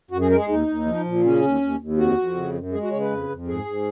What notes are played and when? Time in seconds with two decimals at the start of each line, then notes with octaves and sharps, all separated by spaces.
0.11 F#2 F#4
0.21 G#4
0.30 G#3 A#4
0.39 G#4
0.48 D#2 D#4
0.67 D#2
0.86 F3
1.05 A#2
1.24 C#3 C#4
1.42 D#2
1.61 D#2
1.79 D#2
1.97 F2 F#4
2.17 F2
2.35 C#3
2.54 F#2
2.72 G#3 G#4
2.82 F#4
2.91 C#3 C#5
3.00 B4
3.10 F2
3.29 F2
3.47 G#2 G#4
3.65 G#2